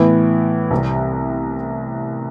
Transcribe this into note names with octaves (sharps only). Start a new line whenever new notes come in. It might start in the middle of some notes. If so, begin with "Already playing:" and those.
Already playing: A2 E3 B3 E4
C2 C3 G3